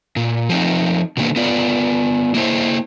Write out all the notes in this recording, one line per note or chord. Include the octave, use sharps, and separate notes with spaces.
A#2
F3 C4 D#4
B2 D3 D#3 G#3 A#3 B3
B3 F4 D5
A#3 E4 C5